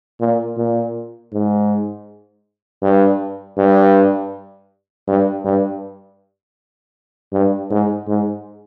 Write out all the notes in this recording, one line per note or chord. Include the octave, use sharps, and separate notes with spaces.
A#2
A#2
G#2
G2
G2
G2
G2
G2
G#2
G#2